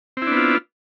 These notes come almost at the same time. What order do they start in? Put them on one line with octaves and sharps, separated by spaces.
C4 E4 D4 B3 F4